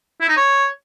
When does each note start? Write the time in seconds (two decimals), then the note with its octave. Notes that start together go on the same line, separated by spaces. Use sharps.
0.21 E4
0.29 D#4
0.37 C#5